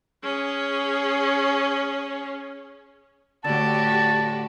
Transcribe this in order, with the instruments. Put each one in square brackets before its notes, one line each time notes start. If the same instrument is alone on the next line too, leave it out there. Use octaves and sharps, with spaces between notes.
[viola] C#4 G#4
[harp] A2 D3 [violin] F#4 G4 [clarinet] A5